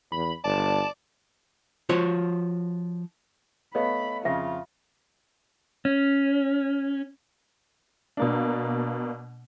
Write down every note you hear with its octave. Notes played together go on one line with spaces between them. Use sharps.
E2 B5
G1 D5 A5
F3 F4 F#4 C5 C#5
A3 B3 C#5 D#5 F5 B5
F2 C#3 F4 E5
C#4
B2 A#3 D4